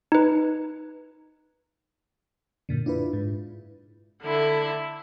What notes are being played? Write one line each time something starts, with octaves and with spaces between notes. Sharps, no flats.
D#4 B4
F#2 A#2 D3
D4 E4 F4 B4
G#2
D3 E4